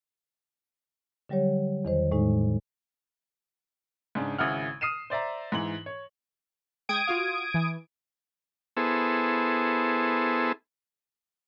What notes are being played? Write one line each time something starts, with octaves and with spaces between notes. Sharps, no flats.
D3 F#3 G3 G4 C#5
E2 D#3 C5
A2 G#3 D#4
G#2 C#3 D4
G#1 C#3 E4 F#5 F6
D#6 F6 C7 D#7 E7
C5 D5 E5 A#5
G#2 E3 F#7
C#5
G#3 G5 D#6 G#6 D7
F4 F#4 F5
E3
B3 E4 G#4 A4 C5